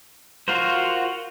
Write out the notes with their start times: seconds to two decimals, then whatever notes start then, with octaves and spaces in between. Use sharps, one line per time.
0.48 F4 F#4 A#4 C5